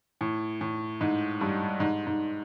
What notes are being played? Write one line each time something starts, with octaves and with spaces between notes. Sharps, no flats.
A2
A2
G#2
G2
G#2
G#2